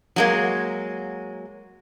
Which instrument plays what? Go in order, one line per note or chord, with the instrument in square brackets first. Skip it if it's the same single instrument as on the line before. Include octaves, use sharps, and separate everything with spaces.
[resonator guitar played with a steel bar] F#3 G#3 A#3